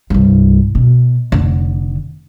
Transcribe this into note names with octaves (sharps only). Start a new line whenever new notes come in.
C2 G2
B2
F1 D3